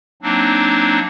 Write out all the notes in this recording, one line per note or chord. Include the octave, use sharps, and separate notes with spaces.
F#3 A#3 C4 D4 D#4